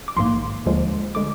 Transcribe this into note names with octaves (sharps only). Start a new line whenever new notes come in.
D6
A#1 G#2 D#3 A#3 C6
D#2 D3 F3 G#3
D3 G#3 D6